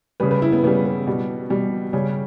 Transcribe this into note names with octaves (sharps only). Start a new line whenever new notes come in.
C#3 G3 B4
B4
E4
B3
C#3 G3 B3
B3
B2 G3
B2 G3
C#3 G3 C#4